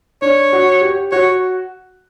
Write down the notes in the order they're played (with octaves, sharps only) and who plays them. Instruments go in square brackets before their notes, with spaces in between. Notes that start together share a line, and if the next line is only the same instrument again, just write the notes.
[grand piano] D4 [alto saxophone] C#5
[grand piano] F#4
G4
[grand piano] F#4 [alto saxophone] C#5